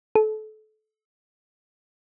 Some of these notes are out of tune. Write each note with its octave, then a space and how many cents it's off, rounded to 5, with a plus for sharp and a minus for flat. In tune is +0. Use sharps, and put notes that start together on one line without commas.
A4 -30